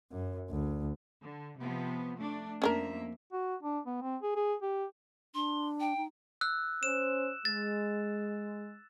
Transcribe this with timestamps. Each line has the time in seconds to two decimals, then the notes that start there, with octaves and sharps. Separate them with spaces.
0.12 F#2
0.50 D2
1.22 D3
1.59 C3 F3 B3
2.17 A3 D4
2.62 F2 A#3 C#4 D4 A#4 E5
3.32 F#4
3.63 D4
3.86 B3
4.02 C4
4.22 G#4
4.36 G#4
4.62 G4
5.35 D4 C6
5.80 G5
5.97 D#4
6.41 E6 F#6
6.83 C#4 C5 E7
7.45 G#3 A6